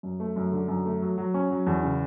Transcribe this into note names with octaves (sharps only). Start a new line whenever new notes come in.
F#2
A3
F#2
D3
F#2
A3
F#3
F#3
C#4
F#3
E2
C#3